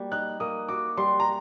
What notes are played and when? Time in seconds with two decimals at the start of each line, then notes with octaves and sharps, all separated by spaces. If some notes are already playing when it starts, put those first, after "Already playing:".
Already playing: G3 A#3 F#4
0.11 D#4 F#6
0.40 A#3 D#6
0.68 F#4 D6
0.97 G3 C6
1.20 A#5